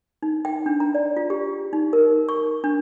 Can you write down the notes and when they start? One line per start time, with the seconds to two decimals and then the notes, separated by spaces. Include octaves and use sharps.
0.23 D#4
0.45 G5
0.66 D4
0.80 A#5
0.95 D5
1.17 F4
1.30 G4
1.73 D#4
1.93 A#4
2.29 C#6
2.64 D4